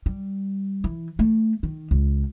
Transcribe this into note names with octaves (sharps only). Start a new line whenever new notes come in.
G3
E3
A3
D#3
C#2